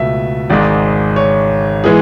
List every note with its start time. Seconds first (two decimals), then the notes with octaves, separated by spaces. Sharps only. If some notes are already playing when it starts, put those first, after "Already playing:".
Already playing: C#2 B2 A3 E5
0.50 G#1 G#2 G#3 D5
1.16 C#5
1.84 E3 G#3 B3 G#4